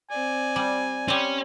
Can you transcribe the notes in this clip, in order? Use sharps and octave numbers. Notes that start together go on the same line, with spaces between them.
C4 D5 G#5
G3
G3 C4 C#4